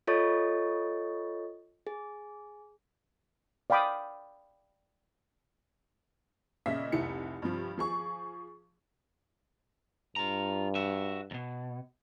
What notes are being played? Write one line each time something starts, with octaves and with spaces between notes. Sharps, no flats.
F4 A4 C#5 D#5 C#6 A6
G#4
D5 F5 G5 B5 D6 D#6
A#2 C#3 D#5 E5 B6
F1 C2 D#4 E4 C#7
G2 C3 F3
F3 G#4 C#6
G2 F4 A#5
F#4 E5
D#2 B2